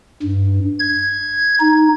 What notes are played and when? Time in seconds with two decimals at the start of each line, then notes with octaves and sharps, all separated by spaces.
0.23 G2
0.79 G#6
1.60 D#4